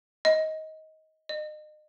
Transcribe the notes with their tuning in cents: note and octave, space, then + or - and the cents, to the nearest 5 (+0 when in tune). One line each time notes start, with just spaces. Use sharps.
D#5 +20
D#5 -35